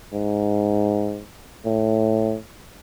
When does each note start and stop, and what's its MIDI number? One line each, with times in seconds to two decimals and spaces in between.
0.13 1.24 44
1.65 2.36 45